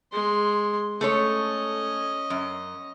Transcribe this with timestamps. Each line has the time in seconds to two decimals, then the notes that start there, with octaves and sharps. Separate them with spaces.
0.12 G#3 C6
1.01 A3 C#4 A4 C#5 D#5
2.30 F#2